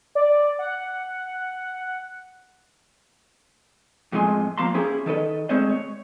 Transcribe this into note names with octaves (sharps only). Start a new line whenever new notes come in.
D5
F#5
F2 A2 G#3 G#5 C6
F3 A#3 F5 A5 A#5 C6
C#4 E4 G4 G#4
D#3 A4 B4 D#5
G#3 A3 C4 C5 C#5 D#5
C#5